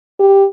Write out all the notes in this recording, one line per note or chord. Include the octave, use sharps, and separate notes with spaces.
G4